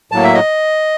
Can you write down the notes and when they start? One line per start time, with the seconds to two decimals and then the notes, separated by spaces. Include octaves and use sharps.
0.12 A2 F#3 A#3 A5
0.24 E5
0.34 D#5